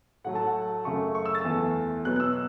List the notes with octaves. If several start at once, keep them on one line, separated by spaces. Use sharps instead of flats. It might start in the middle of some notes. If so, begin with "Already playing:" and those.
A2 F#3 A3 F#5
A5
F#5
F#2 C#3 A3 C#6
C#6
E6
A6
E2 E3 A3
B2 F#3 B3 F#6
F#6
E6